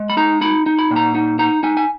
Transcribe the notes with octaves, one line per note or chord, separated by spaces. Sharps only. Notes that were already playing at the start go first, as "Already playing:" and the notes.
Already playing: G#3
B5
D#4 A#5
D#4 B5
D#4
B5
A#2
A#5
D#4
D#4 A#5
D#4 G#5
G#5